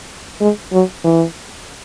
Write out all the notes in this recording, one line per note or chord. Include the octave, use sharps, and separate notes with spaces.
G#3
F#3
E3